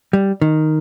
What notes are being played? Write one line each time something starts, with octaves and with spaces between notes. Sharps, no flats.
G3
D#3